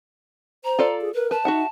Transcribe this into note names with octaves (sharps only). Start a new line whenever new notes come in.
C5 A#5
F4 A4 D5
G#4
A#4 B4
B4 A5
D#4 F#4 E5 F#5